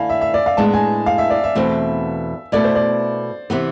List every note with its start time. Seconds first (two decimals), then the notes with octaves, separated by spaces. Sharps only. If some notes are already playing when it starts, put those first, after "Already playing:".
Already playing: D3 A3 E4 F5 G#5
0.10 E5
0.21 E5
0.34 D5
0.46 F5
0.57 A2 G#3 B3 D4 A5
0.74 G#5
1.06 F5
1.18 E5
1.30 D5
1.44 E5
1.55 E2 B2 A3 C4
2.52 B2 A3 E4 D5
2.64 C5
2.76 D5
3.50 C3 E3 B3